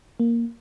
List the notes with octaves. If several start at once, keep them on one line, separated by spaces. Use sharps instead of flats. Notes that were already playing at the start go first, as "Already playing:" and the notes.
A#3